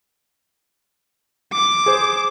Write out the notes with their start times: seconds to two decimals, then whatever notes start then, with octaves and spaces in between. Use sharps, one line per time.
1.53 D6
1.86 G#4 C5